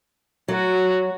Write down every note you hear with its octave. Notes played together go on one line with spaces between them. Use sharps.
F#3 F#4